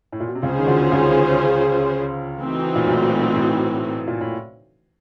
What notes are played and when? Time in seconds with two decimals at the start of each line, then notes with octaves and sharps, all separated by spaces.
0.12 A2
0.20 A#2
0.28 B2
0.35 C3
0.43 C#2 C#3 C#4 F4 G#4 C5
0.58 D#3
0.67 D2 D3
0.92 C#2 C#3
2.38 E3 A3 C4 D#4 F#4
2.75 A#2
2.87 B1 B2
3.36 A2
4.07 A#2
4.21 A2